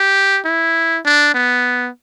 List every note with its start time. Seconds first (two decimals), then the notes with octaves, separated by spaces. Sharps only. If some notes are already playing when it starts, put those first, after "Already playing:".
Already playing: G4
0.45 E4
1.05 D4
1.35 B3